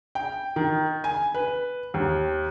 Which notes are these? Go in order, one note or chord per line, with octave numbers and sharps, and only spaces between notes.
G5
D#3
G#5
B4
D#2